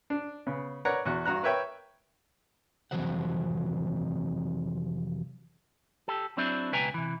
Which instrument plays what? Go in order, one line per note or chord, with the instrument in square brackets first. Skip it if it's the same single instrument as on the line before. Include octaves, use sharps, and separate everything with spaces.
[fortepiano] D4
C#3 B3
A#4 B4 C#5 D5 F#5 A#5
E2 F#4 F#5
G2 F#4 A#5 F#6
A#4 B4 C#5 E5 G5
[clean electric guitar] F2 C3 E3 F#3 C5 F#5
G4 A4
F#3 C4 D4 E4
C#2 B2 B4 G5 G#5 A#5
C3 E3